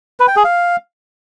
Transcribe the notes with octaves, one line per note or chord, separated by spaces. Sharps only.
B4
G5
G#4
F5